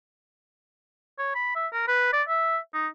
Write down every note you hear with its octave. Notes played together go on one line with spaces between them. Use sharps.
C#5
B5
E5
A#4
B4
D5
E5
D#4